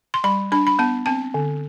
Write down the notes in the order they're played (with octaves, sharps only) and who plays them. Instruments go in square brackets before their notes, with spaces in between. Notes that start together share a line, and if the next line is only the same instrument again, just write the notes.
[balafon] C6
G3 B5
D4 B5
B5
B3 A5
C4 A5
D3